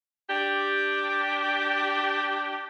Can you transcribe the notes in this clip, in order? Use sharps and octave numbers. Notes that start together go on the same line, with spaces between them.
D4 G4